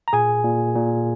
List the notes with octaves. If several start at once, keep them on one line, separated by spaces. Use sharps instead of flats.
A#5
A#2 G#4 G#5
A#2
A#2